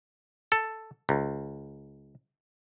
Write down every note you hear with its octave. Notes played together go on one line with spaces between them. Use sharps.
A4
C#2